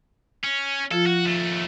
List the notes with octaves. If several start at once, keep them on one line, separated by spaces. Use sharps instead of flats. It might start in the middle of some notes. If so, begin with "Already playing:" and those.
C#4
F3 F4 A4
F#4
D#2 A3